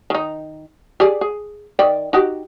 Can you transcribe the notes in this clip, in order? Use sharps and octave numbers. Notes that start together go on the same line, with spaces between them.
D#3 D#4
G4 G#4 D5
G#4
D#3 D5 G5
D#4 F#4 G4